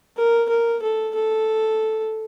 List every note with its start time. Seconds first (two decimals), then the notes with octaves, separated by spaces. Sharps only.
0.17 A#4
0.49 A#4
0.82 A4
1.15 A4